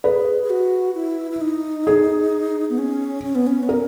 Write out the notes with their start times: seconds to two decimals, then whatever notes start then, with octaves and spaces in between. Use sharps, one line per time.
0.04 G#4 B4
0.43 G#4
0.50 F#4
0.95 E4
1.31 E4
1.41 D#4
1.87 G#4
2.70 B3
2.78 C#4
3.24 C#4
3.35 B3
3.47 C#4
3.63 B3
3.69 C#4 A#4